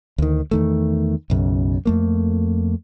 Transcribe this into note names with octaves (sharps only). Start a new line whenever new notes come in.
D2 D#3
E2 D#3 A3
B1 F#2 C#3
F2 A3 A#3